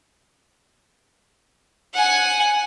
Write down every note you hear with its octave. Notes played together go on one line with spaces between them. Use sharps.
F#5 G#5